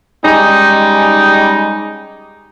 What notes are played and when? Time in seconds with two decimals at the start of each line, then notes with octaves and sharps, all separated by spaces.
0.24 G3 G#3 C#4 D#4